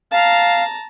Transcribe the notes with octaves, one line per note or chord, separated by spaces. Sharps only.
F5 A5 A#5